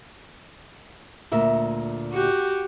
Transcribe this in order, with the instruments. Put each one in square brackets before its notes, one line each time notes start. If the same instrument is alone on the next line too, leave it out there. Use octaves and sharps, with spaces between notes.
[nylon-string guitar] D2 A#2 E5
[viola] F#4 G4